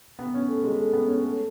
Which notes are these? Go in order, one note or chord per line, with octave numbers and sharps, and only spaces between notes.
B3
C#4
A3
G#3
A3
B3
C#4
A3